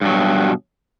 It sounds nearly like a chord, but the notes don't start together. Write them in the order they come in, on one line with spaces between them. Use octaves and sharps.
G2 F#3 B2